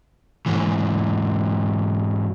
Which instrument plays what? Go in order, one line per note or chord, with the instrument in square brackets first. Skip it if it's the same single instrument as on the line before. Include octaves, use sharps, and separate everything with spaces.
[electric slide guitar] G#2 E3